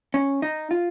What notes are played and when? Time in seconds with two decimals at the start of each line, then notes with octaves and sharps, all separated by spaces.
0.14 C#4
0.42 D#4
0.71 F4